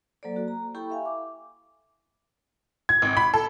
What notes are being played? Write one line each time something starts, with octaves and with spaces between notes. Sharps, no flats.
F#3 A#3 A4 C5 D5
A#3 F#4
A#5
E4 G4 A4 G5 B5 C#6
E5 F5 G#5
D6
G#6
G#1
B5
A4